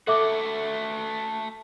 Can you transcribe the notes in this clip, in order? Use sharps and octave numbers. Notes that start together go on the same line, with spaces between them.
A3 F#4 A4 E5 D6